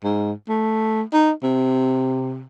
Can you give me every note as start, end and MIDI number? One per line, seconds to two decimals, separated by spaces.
0.04 0.32 44
0.49 1.02 57
1.13 1.31 63
1.43 2.44 48